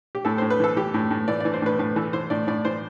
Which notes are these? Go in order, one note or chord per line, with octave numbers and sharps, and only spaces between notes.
G4
A2 A4
A2 C5
B4
E3 A4
E3 G4
A2
A2
E3 D5
E3 D5
C5
A2 B4
A2 B4
E3 A4
E3 C5
A2 D5
A2 D5
E3 C5